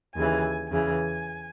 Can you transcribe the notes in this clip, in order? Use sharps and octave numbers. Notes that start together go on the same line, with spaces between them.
D#2 C#3 E3 G#5
E2 C#3 E3 G#5